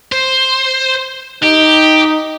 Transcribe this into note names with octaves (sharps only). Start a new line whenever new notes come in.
C5
D#4 G4